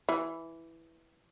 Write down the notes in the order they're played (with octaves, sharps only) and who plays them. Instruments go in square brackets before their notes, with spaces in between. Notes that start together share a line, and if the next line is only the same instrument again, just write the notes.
[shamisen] E3